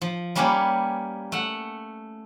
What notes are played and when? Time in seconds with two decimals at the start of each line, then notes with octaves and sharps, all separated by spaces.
0.02 F3
0.35 G3 A#3 C#4 G4 B4 C#5
1.32 A3 F#5